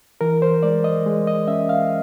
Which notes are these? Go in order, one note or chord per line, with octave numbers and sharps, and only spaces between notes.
E3 A#4
C5
G#3 D5
D#5
G#3
D#5
C#4 E5
F5